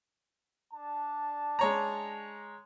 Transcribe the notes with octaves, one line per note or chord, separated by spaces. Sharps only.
D4 A5
G#3 C#5 A#5